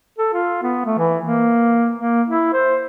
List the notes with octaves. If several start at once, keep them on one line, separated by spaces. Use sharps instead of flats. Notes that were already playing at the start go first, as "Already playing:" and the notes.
A4
F4
B3
A3
E3
A#3
A#3
E4
C5